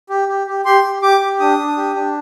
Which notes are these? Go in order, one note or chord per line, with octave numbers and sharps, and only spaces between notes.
G4
G4
G4
G4 C6
G4
G4 D6
G4
D4 D#6
D4
G4
D4